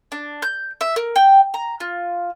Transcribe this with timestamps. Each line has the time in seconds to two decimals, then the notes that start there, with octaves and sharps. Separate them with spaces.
0.12 D4
0.42 G6
0.81 E5
0.96 A#4
1.16 G5
1.54 A#5
1.80 F4